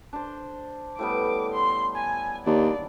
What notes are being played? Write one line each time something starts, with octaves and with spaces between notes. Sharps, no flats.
D4 C5
A2 G3 B3 D6
C6
G#5
D#2 D4 D5